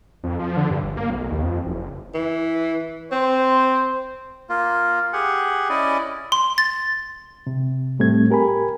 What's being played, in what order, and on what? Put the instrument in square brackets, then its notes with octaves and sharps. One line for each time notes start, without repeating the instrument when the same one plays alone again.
[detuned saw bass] F2
F3
D3
G2
G1
A#3
B1
D#2
F2
F#1
[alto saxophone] E3
[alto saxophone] C4 [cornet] C5
[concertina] A#3 F4
G4 G#4 F#5
C#4 E4 D5 D#5
[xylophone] C6
A6
[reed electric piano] C3
A2 G3 A3 C4 G#6
G4 A#4 G#5 B5